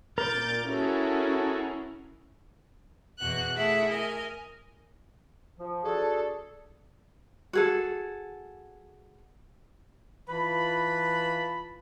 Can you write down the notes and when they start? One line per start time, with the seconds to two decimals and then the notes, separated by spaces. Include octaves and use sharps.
0.18 A#2 A#4 D6 G6 A6
0.66 C#4 E4 F#4 G#4 A4
3.19 E2 B2 F#4 F#6
3.55 A3 E4 G#4 A4 E5 F#5
3.90 A#4 D#5 G#5
5.59 F3
5.84 D4 F#4 G#4 A4
7.53 F#4 G#4 A4
10.29 E3 F4 B4 A5 B5